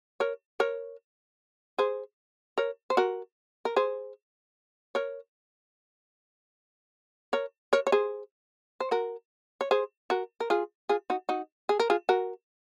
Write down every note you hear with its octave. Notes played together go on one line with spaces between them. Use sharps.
A#4 C#5
A#4 C#5
G#4 C5
A#4 C#5
C5
F#4 A#4
A#4
G#4 C5
A#4 C#5
A#4 C#5
A#4 C#5
C#5
G#4 C5
C5
F#4 A#4
C#5
G#4 C5
F#4 A#4
A#4
F4 G#4
F4 G#4
D#4 F#4
D#4 F#4
G#4
A#4
F4 G#4
F#4 A#4